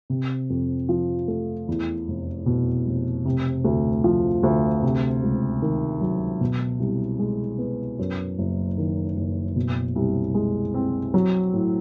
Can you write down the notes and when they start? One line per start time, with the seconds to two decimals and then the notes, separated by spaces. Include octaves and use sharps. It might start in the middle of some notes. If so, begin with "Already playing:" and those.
0.10 C3
0.50 F2
0.89 F3
1.28 A3
1.68 E2
2.08 F1
2.46 B2
2.86 F1
3.25 C3
3.64 D2
4.04 F3
4.43 D2
4.83 C3
5.23 C#2
5.62 D#3
6.01 F#3
6.41 B2
6.80 C2
7.19 G#3
7.59 B3
7.99 F#2
8.38 F#1
8.78 D#3
9.17 F#1
9.56 B2
9.96 C2
10.34 G#3
10.74 C4
11.14 F#3
11.54 A2